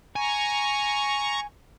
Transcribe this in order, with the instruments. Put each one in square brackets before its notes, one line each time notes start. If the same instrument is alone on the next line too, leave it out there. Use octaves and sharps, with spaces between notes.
[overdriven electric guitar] G#5 [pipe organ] A#5 C#6